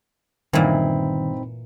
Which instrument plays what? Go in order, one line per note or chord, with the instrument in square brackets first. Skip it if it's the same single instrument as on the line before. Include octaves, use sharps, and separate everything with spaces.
[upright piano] G1 [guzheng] A#2 E3 [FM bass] D#3 [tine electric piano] C4 D#4 B5